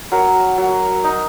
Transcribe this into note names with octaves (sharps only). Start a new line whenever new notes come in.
F#3 A#4
F#3
D#4